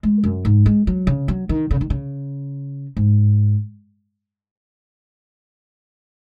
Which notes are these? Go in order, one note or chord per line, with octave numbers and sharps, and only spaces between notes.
G#3
F#2
G#2
G#3
F#3
C#3
F#3
D#3
C#3
D#3
C#3
G#2